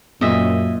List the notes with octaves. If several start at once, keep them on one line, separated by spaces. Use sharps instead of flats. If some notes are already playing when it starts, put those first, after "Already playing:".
F#2 A#2 D#5 E5